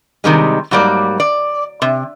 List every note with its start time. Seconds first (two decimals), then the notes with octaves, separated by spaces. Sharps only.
0.24 C3 D#3 G3 G#3
0.71 G#2 F#3 G3 A#3 D5
1.20 D5
1.82 C3